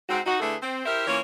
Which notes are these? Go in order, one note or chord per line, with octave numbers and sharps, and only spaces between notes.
G#2 C4 F#4
D#4 F#4
D3 A3 E4 G#4 A4 B4
C4
E4 G4 A#4 C5 E5
E3 A#3 C#4 F4 C#5